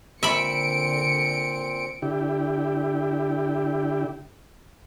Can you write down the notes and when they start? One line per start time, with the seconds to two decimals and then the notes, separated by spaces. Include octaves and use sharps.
0.23 A#2 D3 C4 E5 B5 C#7 D7
2.02 D3 E4 G4